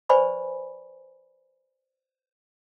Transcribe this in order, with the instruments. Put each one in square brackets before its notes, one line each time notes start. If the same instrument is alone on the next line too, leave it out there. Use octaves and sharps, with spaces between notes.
[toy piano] B4 C5 D5 G#5 B5 C#6